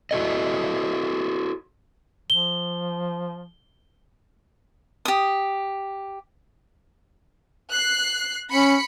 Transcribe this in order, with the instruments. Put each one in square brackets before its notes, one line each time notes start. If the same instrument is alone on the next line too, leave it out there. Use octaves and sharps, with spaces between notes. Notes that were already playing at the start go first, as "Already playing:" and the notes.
[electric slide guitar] E4 F#4 A4 D#5
[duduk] F3 [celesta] G7
[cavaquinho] G4 D#6
[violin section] F#6 C7
[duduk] C#4 [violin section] B5 C#7